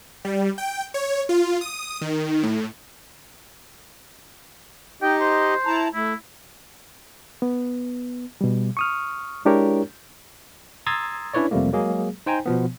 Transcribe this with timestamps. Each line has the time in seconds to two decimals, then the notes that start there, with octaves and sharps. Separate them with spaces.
0.25 G3
0.58 G5
0.94 C#5
1.29 F4
1.61 D#6
2.01 D#3
2.43 A2
5.02 D#4 G4 D#5 G5
5.21 C5
5.66 E4 A5 A#5
5.94 A3 E4
7.42 B3
8.41 B2 G3
8.77 C#6 D#6 F6
9.45 G#3 D4 E4 G4 A#4 C#5
10.86 A#5 C6 D#6 E6 G#6 A6
11.34 C#4 D4 E4 B4 C#5 D5
11.51 F2 C3 F3 G3 A3 A#3
11.73 F#3 G#3 A#3 G#4
12.26 D#4 C5 G5 G#5 A#5
12.46 B2 F3 B3